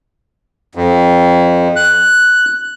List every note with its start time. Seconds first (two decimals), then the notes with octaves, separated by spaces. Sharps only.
0.75 F2
1.76 F#6